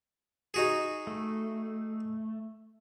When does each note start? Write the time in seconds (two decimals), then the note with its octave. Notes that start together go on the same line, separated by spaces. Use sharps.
0.54 D#4 F#4 G#4
1.07 A3